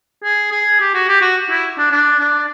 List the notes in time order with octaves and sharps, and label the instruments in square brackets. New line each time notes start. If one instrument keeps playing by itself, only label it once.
[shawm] G#4
G#4
G4
F#4
G4
F#4
E4
D4
D4
D4